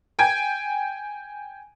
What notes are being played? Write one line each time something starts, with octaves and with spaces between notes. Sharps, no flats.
G5 G#5 G#6